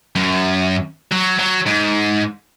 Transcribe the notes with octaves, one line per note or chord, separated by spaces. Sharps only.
F#2
F#3
F#3
G#2